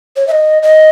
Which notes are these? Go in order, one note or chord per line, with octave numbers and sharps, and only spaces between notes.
C#5
E5
D#5
D#5